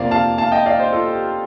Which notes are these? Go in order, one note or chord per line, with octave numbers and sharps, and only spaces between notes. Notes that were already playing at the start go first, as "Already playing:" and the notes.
Already playing: F2 C3 F3 A#3 D5 F5
F5 A5
F5 A5
D#5 G5
D5 F5
C5 D#5
F4 A4
G4